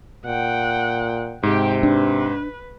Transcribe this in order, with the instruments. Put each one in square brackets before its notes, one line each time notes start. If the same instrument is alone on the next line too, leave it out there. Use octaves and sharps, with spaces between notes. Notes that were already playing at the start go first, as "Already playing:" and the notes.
[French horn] A#2 [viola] F#5 G5
[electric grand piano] G#2 [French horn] C3 [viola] G4 G5
[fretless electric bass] D4 [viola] B4